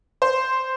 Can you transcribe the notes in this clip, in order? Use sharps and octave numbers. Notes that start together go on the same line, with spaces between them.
C5